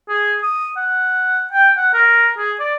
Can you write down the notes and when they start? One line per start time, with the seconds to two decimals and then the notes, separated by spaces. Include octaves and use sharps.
0.09 G#4
0.43 D#6
0.77 F#5
1.53 G5
1.78 F#5
1.94 A#4
2.38 G#4
2.60 D5